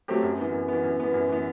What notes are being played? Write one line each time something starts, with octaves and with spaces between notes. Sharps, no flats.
F#3 A3 C4 G4
F#2
E3 B3
F#2
E3 B3
F#2
E3 B3
F#2
E3 B3